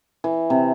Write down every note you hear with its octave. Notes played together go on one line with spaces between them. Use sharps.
E3
C3